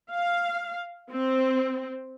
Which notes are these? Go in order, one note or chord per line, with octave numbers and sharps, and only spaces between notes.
F5
C4